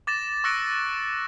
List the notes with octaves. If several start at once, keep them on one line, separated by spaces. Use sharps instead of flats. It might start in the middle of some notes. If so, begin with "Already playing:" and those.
D6 A6 A#6 E7
C#6 E6 F#6 A#6 C#7 D7